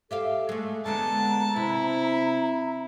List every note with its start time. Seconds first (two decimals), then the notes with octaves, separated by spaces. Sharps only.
0.11 G4 A4 E5 F5
0.49 G#3 A3
0.86 D3 G#3 B3 A5 A#5
1.56 C3 E4